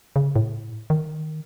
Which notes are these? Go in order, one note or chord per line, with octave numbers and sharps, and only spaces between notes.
C#3
A2
D#3